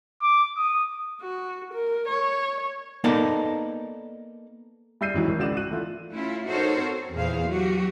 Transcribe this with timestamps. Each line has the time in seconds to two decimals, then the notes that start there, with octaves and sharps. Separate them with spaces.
0.22 D6
0.58 D#6
1.22 F#4
1.74 A#4
2.09 C#5
3.04 A#3 B3 D#4 A4 A#4 D5
5.01 G3 E5 E6 G6 C7 D#7
5.14 G#2 E3 F#3
5.27 G#1
5.39 C#2 F#4 D5 E7
5.57 F#4 F#6 D#7
5.70 E3 A3 F4
6.11 A3 C#4 E4 F4
6.49 D#4 F#4 A4 A#4 C5 C#5
6.83 C4
7.13 E2 A#2 G#4 C5 F5
7.47 F#3 F#4 G4